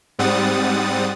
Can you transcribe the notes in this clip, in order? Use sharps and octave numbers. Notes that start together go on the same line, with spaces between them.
G#2 G3 C4 F#5 D#6 A6